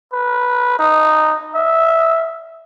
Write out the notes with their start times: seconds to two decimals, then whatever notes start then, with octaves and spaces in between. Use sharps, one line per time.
0.13 B4
0.79 D#4
1.55 E5